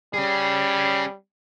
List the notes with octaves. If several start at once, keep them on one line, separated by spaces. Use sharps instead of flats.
G3 C#4 G#4